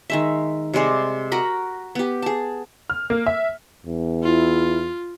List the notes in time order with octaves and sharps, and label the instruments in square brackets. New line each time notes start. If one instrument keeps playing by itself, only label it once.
[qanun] D#3 G#3 E5
C3 G3 G#3 D5
F#4 A#4 B5
B3 G4
G#4 A5
[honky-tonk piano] F6
A#3
E5
[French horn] E2
[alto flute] E4 [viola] F4